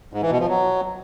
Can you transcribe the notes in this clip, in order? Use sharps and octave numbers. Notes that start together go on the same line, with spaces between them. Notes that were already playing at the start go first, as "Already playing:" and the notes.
G#2
E3
B2
F3
F#3